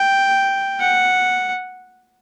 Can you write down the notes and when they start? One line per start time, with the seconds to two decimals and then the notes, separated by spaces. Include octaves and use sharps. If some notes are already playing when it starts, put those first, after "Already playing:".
Already playing: G5
0.80 F#5